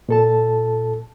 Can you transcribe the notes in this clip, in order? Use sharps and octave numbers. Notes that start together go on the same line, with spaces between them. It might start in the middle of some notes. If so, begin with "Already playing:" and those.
A#2 A4 A5